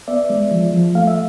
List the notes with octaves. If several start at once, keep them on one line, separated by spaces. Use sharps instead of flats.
B3 D5 E5
G#3
F3
F3
A3 F5
E5